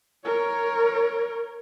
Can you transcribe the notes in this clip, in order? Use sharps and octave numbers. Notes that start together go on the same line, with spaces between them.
A#4 C#5